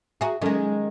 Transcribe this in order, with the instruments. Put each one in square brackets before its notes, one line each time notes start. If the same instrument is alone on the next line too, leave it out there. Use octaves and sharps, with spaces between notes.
[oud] F#4 G#4 [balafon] E5 A#5
[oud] D#3 G#3 [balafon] F#3 C#4 A4